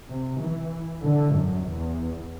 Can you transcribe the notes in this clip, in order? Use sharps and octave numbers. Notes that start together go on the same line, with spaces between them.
C3
E3
D3
F#2
E2